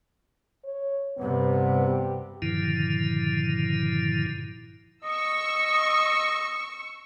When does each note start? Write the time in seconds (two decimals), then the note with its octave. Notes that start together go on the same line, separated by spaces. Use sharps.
0.64 C#5
1.18 G2 C3 B3
1.88 G4
2.42 G2 A#2 D3 D#3 F3 E4
5.04 D#5 C#6 E6